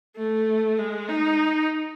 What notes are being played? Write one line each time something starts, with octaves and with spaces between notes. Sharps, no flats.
A3
G#3
D#4